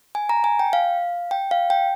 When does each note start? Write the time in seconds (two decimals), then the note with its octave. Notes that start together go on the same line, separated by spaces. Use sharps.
0.15 G#5
0.29 A#5
0.44 G#5
0.59 G5
0.73 F5
1.31 G5
1.51 F5
1.70 G5